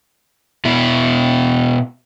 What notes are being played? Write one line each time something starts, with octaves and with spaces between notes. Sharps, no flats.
B2 E4